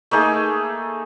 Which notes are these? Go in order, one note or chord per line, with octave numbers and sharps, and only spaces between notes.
A3 A#3 D#4 G#4